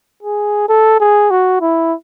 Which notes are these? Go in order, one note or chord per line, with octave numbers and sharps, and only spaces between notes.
G#4
A4
G#4
F#4
E4